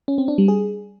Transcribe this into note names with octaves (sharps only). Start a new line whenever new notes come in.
C#4
C4
D4
G3
G#4